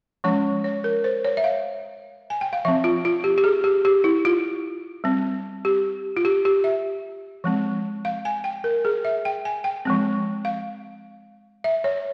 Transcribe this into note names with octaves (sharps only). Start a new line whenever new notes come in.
F3 G#3 C#4 C#5
C#5
A#4
C5
C#5
E5
F5
G#5
G5
F5
F3 C4 E5
F4
F4
G4
G4
G#4
G4
G4
E4
F4
G3 C4
G4
F4
G4
G4
E5
F3 G#3 C4
F5
G#5
G5
A#4
G#4
E5
G5
G#5
G5
F3 G#3 C4
F5
E5
C#5